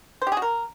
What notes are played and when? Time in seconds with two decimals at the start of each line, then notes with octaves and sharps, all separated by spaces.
0.22 C5
0.27 G4
0.32 G#4
0.37 F#4
0.42 A#4